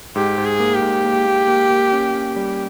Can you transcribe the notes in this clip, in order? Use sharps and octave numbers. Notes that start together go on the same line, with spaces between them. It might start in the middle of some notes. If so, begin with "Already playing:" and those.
G#2 G4
G#2
G#4
A#3
G4
G#2
A#3
A#3
A#3
A#3
C#4
C#4
G3